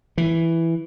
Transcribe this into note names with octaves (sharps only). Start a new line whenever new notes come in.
E3